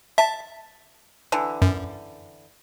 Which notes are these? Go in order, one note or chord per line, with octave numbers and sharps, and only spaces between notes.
E5 A5
D3 E3
F#2